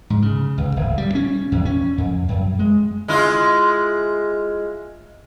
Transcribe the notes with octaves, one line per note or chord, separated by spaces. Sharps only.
G#2
C#3
C#2
D1
G3
C#4
E2
C#4
F2
F#2
G#3
G#3 E4 F4